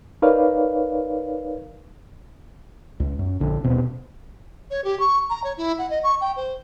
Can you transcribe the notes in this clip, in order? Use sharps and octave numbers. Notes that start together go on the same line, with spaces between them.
D#4 A#4 B4 C#5 D5 F5
C#2
F#2
A#1 D3
D#1 B2 C4
C#5
G4
C#6
A#5
C#5
E4
F#5
D#5
C#6
G5
C5